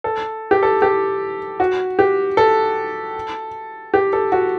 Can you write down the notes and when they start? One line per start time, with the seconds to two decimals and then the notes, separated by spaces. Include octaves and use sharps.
0.04 A4
0.51 G4
0.63 A4
0.82 G4
1.60 F#4
1.99 G4
2.37 A4
3.94 G4
4.13 A4
4.32 F#4